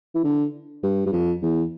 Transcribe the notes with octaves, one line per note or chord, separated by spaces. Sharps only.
E3
D3
G2
G2
F2
E2